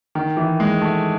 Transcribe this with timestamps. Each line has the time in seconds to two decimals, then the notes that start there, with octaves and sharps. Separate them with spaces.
0.15 D#3
0.37 E3
0.60 G#3
0.82 A3